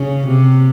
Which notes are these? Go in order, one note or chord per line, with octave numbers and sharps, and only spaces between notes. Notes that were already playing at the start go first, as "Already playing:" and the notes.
Already playing: C#3
C3